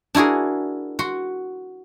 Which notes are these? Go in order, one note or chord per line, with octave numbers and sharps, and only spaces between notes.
D4 E4 F#4 G#4 A#4
F#4 C6